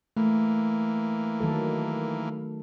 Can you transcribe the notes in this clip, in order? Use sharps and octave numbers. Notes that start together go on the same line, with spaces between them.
E3 A3 A#3
D#3 F#3 A4